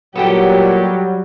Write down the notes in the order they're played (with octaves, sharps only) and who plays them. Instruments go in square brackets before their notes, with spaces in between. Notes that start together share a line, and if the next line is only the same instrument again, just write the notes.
[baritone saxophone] A#2 [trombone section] F#3 G3 [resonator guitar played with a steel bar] B3 A4 G5 [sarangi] G4